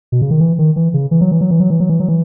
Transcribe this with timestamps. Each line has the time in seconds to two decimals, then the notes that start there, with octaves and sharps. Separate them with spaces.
0.12 B2
0.22 C#3
0.31 D#3
0.40 E3
0.58 D#3
0.76 E3
0.94 C#3
1.11 E3
1.21 F#3
1.31 E3
1.41 F#3
1.51 E3
1.60 F#3
1.70 E3
1.80 F#3
1.90 E3
2.00 F#3
2.09 E3